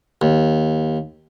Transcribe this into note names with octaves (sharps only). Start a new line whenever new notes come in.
D#2